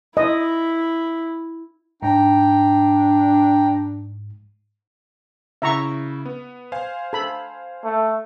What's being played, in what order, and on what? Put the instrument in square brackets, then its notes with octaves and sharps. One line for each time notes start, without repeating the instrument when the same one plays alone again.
[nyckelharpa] E4 [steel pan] D#5
[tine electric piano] G#2 [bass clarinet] D4 [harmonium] G5 A#5
[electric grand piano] C#3 E4 [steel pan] E5 A#5 C#6
[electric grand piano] B3
C5 F5 G#5
[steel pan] A4 B5
[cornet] A3